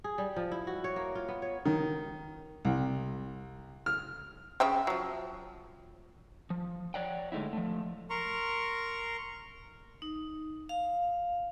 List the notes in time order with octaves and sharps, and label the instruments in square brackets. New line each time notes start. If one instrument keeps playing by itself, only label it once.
[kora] G#4
G3
F3
E4
F#4
C#5
A#3
F4
B3
C#5
[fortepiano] D#3
C2
F6
[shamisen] C#3 E5 G5
F3 F#3
[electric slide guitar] F3
C#5 D5 F#5 G5
D3 G#3 A3 D#4 E4
F3 A3
[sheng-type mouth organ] A#4 A#5 C6 C#6
[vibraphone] D#4
F5